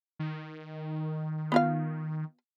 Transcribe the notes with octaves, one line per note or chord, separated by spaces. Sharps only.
D#3
B3 F4 F5